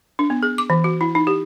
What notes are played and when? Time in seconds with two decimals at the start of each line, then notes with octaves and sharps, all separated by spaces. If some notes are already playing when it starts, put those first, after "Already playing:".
0.19 D4
0.30 B3
0.43 G#4
0.58 D6
0.70 E3
0.84 F#4
1.01 E4
1.15 D#4
1.27 G4